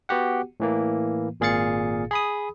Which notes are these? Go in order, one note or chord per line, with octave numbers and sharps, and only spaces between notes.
B3 F#4 G4 F#5
A2 E3 A#3
G#1 A#2 G#4 F5 A6 C#7
G#4 B5 D#6